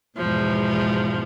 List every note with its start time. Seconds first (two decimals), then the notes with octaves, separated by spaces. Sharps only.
0.16 E2 G#2 B2 F3